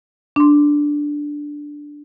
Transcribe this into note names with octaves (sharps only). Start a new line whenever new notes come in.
D4 C6